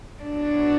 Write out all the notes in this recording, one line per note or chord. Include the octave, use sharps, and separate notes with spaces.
A2 F#3 B3 D4 F#4